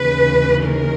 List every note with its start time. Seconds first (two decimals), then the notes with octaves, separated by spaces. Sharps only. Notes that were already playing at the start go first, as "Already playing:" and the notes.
Already playing: D#2 C#3 E3 B4
0.64 A#4